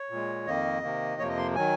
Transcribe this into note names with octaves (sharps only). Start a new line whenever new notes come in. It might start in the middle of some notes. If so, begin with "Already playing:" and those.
Already playing: C#5
A#2 G#3
F2 D#3 A#3 D#5
C3 D#3 A#3
F2 C3 F3 A#3 C#5
D#5
C6
D#3 F#3 G#5